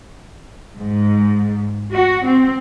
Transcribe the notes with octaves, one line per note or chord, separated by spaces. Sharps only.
G#2
F#4
C4